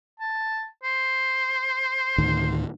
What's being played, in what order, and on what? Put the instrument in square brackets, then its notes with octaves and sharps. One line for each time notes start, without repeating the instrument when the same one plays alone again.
[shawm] A5
C5
[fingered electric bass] D2 A2 D#3